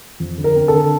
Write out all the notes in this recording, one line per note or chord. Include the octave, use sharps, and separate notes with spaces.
F2
D3
A#4
C4
A4
D3